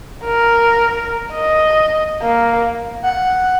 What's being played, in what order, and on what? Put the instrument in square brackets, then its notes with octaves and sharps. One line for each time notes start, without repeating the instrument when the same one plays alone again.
[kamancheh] A#4
D#5
A#3
[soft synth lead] F#5